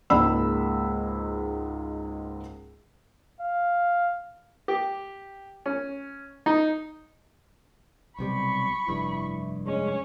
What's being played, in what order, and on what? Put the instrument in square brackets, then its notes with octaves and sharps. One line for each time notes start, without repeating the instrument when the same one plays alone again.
[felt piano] C#2 G#2 G#3 A#3 B5 E6
[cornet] F5
[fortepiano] G4
C#4
D#4
[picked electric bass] B1 C3 G3 [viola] B5 C#6
[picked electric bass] F1 G2 [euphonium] E4
[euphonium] G#3 [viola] C#4